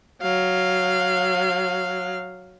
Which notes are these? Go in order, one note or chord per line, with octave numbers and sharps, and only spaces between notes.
F#3 F5